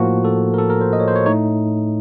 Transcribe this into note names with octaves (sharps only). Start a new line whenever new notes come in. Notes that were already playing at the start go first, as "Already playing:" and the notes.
Already playing: A2 F3 A#3 F#4
A4
A#4
A4
A#4
C5
D#5
C#5
C5
C#5
A2 A3 D#4 C#5